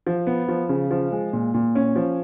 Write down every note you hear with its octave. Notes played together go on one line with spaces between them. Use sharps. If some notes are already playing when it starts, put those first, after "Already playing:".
F3
B3
F3
C#3
F3
G#3
A#2
A#2
C#4
F3